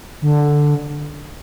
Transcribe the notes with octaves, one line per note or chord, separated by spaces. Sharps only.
D3